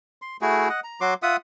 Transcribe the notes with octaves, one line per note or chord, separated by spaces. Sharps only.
C6
A3 E4 F#4 G#4
D#5 F#5
A#5
F#3 F#4 C6 D6
F4 E5 F#5 D#6